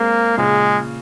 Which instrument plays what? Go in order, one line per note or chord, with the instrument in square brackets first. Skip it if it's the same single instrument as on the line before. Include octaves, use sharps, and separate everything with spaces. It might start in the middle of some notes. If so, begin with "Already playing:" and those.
Already playing: [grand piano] G#3 C4 [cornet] A#3
[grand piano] A#2 C#3 [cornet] G#3